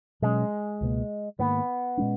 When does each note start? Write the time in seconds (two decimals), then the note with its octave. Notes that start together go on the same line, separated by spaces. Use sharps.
0.22 B2 F#3 G#3 C#4
0.81 C#2 B2 A#3
1.39 G#2 D#3 A#3 B3
1.97 A#2 G#3 C#4